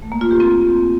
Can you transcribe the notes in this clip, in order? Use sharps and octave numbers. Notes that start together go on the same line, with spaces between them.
A3
A#3
F4
G4
C4